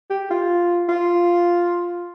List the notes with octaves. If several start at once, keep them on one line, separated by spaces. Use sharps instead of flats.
G4
F4
F4